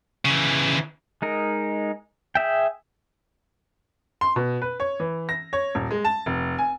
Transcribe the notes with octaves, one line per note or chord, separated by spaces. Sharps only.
C#3 E3
G#3 D#4 A#4
G#4 E5 G5
C6
B2
B4
C#5
E3
A#6
C#5
D#1
G#3
A5
F1
G#5